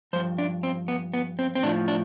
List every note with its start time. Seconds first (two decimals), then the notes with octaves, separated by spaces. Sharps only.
0.13 G2 F3 C5
0.38 D4
0.63 C4
0.88 B3
1.14 B3
1.39 C4
1.55 C4
1.63 A2 F3 D4
1.88 D4